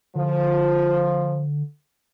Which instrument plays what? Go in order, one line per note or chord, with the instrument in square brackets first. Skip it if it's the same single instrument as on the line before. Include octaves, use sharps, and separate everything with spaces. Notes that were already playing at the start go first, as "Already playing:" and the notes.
[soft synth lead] D3 [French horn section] F3